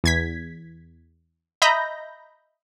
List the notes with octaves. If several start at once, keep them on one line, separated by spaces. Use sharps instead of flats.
E2 G#6 B6
D#5 E5 A#5 B5 G6 A#6